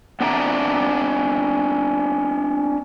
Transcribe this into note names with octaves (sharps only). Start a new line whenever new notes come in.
B3 C4 D4 D5 E5 A#5